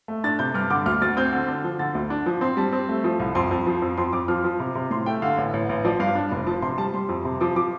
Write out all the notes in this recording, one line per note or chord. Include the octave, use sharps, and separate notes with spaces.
A3
D4 A6
C3 G6
G2 F6
D3 D6
D2 F6
D2 A6
C4 G6
D3
D4
F3
D3 A6
D2
D4
F3
C4 C6
G3 A5
C4
A3
F3
C2
F2 C6
F2
F3
F2
F2 C6
F2 D6
F3 F6
F3
C3
C3
A2 C6
A3 G5
D3 F5
A1
A1
A1
F3 D5
G2 F5
D4
F1
F3 A5
C3 C6
G3 A5
G3 C6
F2
C3
F3 D6
F3 D6